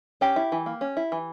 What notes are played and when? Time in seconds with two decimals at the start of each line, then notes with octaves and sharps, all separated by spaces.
0.21 C#4 G4
0.36 E4
0.52 E3
0.66 A#3
0.81 C#4
0.97 E4
1.12 E3